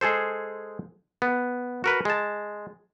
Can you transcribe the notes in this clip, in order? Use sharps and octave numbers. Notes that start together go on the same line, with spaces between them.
G#3 G#4 A4 C5
B3
F#4 A#4 B4
G#3 A5